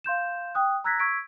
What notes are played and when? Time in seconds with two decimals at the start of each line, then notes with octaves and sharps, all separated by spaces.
0.04 F5 C6 G6 E7
0.55 G5 D#6 F#6
0.84 A#5 E6 F#6 G#6 A#6 B6
1.00 C#6 E6 G#6 B6 D7